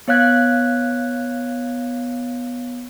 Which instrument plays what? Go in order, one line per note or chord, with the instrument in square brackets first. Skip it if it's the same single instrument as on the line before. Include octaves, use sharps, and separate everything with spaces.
[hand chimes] B3 C#5 F5 F#6 G#6